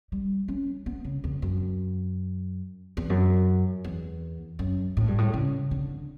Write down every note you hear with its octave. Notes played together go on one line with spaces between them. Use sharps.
G3
C#4
B3
C#3
E2
F#2
E2
F#2
E2
F#2
A2
G2
A2
C#3
D3